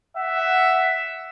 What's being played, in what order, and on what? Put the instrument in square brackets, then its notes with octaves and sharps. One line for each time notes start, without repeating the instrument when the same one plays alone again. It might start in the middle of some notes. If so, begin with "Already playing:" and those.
[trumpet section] E5 F#5